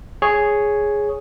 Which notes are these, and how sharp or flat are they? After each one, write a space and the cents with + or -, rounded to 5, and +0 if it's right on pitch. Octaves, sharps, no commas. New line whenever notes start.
G#4 +0 C#5 +0